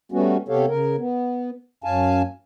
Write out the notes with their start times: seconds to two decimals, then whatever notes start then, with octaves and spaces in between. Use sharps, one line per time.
0.12 G3 A3 B3 C#4 F#4
0.48 C3 B3 G4 A4 C#5 F5
0.68 C#3 A#4
0.98 B3
1.84 F#2 C#4 F5 G#5 A5